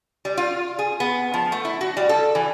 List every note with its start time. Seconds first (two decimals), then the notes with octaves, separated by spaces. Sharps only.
0.25 G3
0.37 F4
0.79 G#4
1.00 B3
1.34 F3
1.52 A3
1.65 E4
1.81 F#4
1.97 G3
2.09 A4
2.35 E3